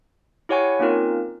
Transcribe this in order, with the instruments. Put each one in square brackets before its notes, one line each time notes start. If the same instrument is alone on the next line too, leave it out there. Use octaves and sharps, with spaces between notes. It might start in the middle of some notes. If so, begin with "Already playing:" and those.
[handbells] E4 G4 C#5 F#5 G#5 C#6
A#3 C4 C#4 D#4 F4 A#4